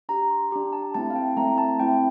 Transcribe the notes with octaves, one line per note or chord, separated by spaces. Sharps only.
D4 G4 A#5
C6
D4 G4 A#5
A5
A3 C4 E4 A5
F5
G5
A3 C4 E4 A#5
A5
A3 C4 E4 G5